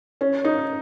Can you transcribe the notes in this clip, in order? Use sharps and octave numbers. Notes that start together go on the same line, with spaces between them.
C#4
D#4